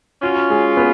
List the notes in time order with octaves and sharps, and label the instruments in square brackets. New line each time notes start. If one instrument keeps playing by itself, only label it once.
[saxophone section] C#4 F4 [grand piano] F#4
[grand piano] G#3
B3